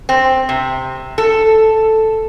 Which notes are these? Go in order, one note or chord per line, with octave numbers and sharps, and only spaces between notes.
C4
C3
A4